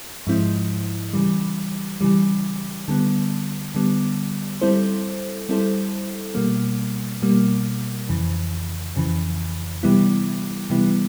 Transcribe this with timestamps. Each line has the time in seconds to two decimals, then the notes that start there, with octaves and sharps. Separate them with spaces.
0.27 G#2 F3 G#3 C4 E4
1.13 C#3 E3 G3
2.01 C#3 E3 G3
2.88 D3 G3 B3
3.75 D3 G3 B3
4.61 G3 C4 E4 A4 C5
5.49 G3 C4 E4 A4 C5
6.35 B2 G3 A#3
7.22 B2 G3 A#3
8.09 F2 C#3 E3
8.96 F2 C#3 E3
9.83 C3 E3 G3 B3 E4
10.70 C3 E3 G3 B3 E4